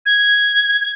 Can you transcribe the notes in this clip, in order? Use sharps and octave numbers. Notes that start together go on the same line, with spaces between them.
G#6